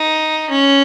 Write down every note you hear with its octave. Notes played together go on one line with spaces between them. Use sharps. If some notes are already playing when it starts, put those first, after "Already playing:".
Already playing: D#4
C#4